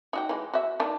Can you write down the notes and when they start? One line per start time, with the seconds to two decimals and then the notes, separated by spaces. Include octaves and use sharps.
0.13 D#4 F#4 G5
0.29 E3 G#3
0.53 F#4 E5
0.80 D#3 D4